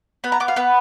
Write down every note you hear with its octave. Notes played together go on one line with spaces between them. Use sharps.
B3 B5
A#5
B3 D6
F5
B3 B4